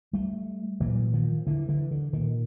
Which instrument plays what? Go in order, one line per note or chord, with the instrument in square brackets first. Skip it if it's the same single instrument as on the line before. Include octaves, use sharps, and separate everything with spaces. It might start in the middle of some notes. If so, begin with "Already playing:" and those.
[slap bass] G3 A3
A#2 E3 F#3
D#3 F3
D3 E3
D3 E3
D3
A#2 D#3